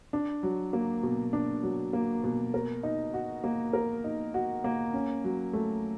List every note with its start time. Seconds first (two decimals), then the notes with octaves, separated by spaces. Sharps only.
0.13 D4
0.43 F#3
0.73 A#3
1.03 B2
1.33 D4
1.63 F#3
1.93 A#3
2.24 B2
2.54 A#4
2.83 D#4
3.14 F#4
3.44 A#3
3.73 A#4
4.04 D#4
4.34 F#4
4.64 A#3
4.94 C#4
5.24 F#3
5.53 A3